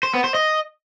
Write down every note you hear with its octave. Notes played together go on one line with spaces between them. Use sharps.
C5
B3
C5
D#5